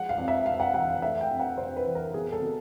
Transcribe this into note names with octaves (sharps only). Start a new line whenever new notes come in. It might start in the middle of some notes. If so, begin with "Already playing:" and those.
Already playing: F3 G#3 F#5
F5
F2
E5
C3 F5
F#5
E3 F#5
F5
A3 E5
G5
F2
F#5
C3 C5
B4
E3
A#4
B2 G#4
A4
B2